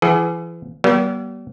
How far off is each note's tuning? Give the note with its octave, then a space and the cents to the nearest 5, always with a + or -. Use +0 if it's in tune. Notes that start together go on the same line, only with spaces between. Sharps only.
E3 +35 G#4 +25 F#5 +45
G3 -40 B3 -45